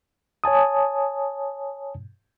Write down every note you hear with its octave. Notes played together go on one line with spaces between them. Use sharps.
C#5 G#5 A5 D#6